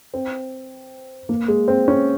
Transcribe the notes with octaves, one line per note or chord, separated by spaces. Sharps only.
C4
A#3
G#3
C4
C#4